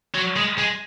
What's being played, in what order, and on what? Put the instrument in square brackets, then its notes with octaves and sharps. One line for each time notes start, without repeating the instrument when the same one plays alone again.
[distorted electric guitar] F#3
G#3
G#3